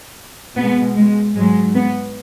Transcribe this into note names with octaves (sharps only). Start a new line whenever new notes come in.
B2 G#3 B3
G#3
G#2 F#3 G#3
B3